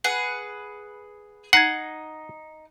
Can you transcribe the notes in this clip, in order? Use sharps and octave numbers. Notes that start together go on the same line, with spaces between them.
G#4 B4 F#5
D#4 F#5 G#6 C7